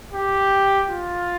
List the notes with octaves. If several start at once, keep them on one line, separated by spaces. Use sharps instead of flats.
G4
F4